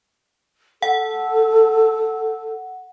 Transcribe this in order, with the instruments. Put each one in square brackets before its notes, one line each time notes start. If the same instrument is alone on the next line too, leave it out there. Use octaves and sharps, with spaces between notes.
[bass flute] A4 [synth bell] F#5